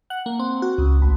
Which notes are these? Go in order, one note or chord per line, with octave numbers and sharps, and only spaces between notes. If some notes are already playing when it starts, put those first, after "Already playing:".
F#5
A#3
C4
F#4
C#2
A1